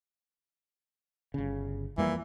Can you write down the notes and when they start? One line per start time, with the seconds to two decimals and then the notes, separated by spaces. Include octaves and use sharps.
1.34 G1 C#3
1.98 F2 E3 G3 A#3